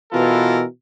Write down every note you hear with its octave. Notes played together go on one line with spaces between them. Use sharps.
B2 E3 F4 A4 A#4